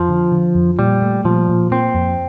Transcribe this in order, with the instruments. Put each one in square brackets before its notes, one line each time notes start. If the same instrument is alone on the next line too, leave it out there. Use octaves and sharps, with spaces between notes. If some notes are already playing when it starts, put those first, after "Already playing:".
Already playing: [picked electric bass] F2 [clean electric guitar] F3
[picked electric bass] D3
D3
F2
[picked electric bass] A#2 [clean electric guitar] G3
[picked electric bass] A3
[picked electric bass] A#2 [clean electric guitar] F3
[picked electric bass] A#2
[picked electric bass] A#3 [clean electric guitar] C4
[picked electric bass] F2